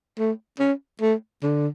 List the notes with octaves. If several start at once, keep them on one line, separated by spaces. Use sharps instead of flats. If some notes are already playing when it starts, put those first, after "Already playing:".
A3
C#4
A3
D3